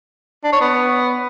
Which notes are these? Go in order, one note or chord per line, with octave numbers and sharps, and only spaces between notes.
D4
C#5
B3